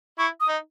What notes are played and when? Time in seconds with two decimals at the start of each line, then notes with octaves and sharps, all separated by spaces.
0.19 E4 C#6
0.41 D#6
0.48 D#4